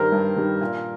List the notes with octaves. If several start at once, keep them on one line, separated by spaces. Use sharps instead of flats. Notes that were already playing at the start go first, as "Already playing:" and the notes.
Already playing: G2 D#3 G3 A#4 C5
G2
D#3 G3
A#2